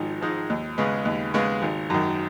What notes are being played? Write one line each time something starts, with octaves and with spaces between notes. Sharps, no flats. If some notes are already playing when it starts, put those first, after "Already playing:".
Already playing: G#1 G#2 F3 G#3 D#4
G#2 F3 G#3 D#4
D#2
C#3 G#3 B3
D#2
C#3 G#3 B3
G#1
F#2 D#3